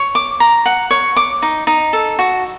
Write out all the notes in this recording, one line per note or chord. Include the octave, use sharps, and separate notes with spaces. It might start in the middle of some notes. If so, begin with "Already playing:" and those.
Already playing: C#5
D6
A#5
F#5
C#5
D6
D#4
D#4
A4
F#4